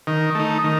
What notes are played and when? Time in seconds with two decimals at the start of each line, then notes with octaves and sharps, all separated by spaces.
0.07 D#3
0.35 A3 D#4
0.64 D#3